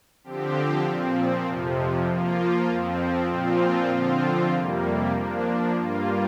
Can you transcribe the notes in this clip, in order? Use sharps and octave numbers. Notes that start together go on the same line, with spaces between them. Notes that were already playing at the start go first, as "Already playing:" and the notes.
D3 F3 C4 G4
A#2 F3 C4
F2 C3 F3
F3 A#3 F4
F2 F3 C4
A#2 F3 C4 F4
D3 F3 C4 F4
F2 C3 G3 A#3
F3 A#3 D4
G2 G3 A#3 F4